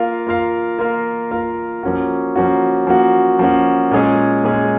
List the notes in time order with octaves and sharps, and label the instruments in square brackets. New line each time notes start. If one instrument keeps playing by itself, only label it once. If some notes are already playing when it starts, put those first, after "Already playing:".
Already playing: [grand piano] A#3 F4 A#4 F5
A#3 F4 A#4 F5
A#3 F4 A#4 F5
A#3 F4 A#4 F5
F3 A#3 C#4 F#4
F3 A#3 C#4 F#4
F3 A#3 C#4 F#4
F3 A#3 C#4 F#4
A#2 G#3 C#4 G#4
A#2 G#3 C#4 G#4